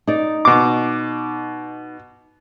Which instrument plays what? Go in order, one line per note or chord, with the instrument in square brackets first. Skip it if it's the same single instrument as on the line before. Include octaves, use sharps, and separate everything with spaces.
[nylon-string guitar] D#4 D5
[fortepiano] B2 D6